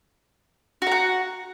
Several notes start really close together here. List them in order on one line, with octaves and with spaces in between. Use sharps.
F#4 A#5 F#5